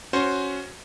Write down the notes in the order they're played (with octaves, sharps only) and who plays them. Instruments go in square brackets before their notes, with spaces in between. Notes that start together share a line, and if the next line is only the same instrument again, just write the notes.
[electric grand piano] C#4 F#4 C5